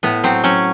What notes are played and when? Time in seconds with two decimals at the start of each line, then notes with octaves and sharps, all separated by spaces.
0.03 A2 B3
0.24 F#3 C4
0.44 F#3 C#4